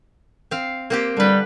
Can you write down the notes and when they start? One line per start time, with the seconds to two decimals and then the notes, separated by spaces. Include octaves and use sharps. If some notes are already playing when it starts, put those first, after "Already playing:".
0.51 C4 F5
0.90 A#3 C4 G4
1.17 D3 G3 B4